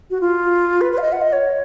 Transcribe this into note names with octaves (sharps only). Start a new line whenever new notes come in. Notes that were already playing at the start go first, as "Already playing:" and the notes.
F#4
F4
B4
B4
F5
D#5
F#5
D#5
C#5